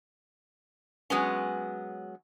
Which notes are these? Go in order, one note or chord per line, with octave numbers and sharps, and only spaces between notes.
F#3 G#3 B3 C#4